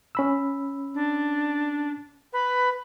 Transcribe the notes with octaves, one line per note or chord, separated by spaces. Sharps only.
C#4 B5 E6
D4
B4